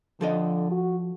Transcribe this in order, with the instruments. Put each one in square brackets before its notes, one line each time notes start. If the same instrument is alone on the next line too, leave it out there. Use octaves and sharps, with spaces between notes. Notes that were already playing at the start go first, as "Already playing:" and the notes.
[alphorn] D3 [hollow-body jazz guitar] F3 A4 D#5
[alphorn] F#4